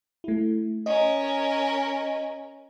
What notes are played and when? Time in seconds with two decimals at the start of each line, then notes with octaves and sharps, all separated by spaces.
0.24 A3 E4
0.86 C#4 A#4 D#5